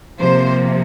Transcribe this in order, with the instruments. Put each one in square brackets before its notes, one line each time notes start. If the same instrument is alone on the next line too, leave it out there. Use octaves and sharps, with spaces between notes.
[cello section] C3 F3 A#3 C5